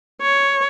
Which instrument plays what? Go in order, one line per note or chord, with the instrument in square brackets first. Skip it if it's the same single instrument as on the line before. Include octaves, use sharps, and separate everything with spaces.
[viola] C#5